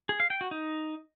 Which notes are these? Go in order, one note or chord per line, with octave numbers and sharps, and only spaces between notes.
G#4
F5
G5
F#4
D#4